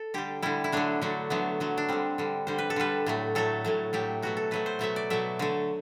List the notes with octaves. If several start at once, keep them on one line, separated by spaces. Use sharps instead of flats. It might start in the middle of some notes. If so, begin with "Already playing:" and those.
Already playing: A4
D3 G3 G4
D3 G3 E4
E4
D3 F#3 A3 D4
D3 F#3 A3
D3 F#3 A3 B3
D3 F#3 A3
D4
D3 G3 C4
D3 G3
D3 G3 C5
B4
A4
D3 G3 B4
A2 F#3 A3
A2 F#3 A3 A4
A2 F#3 A3
A2 F#3 A3 G4
B2 F#3 A3 F#4
A4
B2 F#3 A3 B4
C5
B2 F#3 A3 E5
D5
B2 F#3 A3 E5
D3 A3